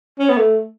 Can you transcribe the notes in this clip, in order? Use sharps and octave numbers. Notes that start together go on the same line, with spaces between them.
C#4
B3
A3